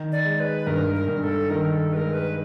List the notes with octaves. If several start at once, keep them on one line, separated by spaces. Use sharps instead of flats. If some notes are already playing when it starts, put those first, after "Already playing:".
Already playing: D#3
D5
G#3
B4
G2 A#4
A#4
G2
A4
D#3 A#4
A4
G#3 A#4 B4
B4